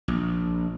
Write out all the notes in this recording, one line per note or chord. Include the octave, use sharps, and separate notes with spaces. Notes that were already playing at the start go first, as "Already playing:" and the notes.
A#1